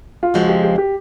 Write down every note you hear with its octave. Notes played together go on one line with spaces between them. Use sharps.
F4
F2 C#3 F3 G#3 F#4
G4
G4
G4